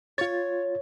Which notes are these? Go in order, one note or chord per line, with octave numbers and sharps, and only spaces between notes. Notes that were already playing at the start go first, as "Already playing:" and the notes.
F4 C#5 A6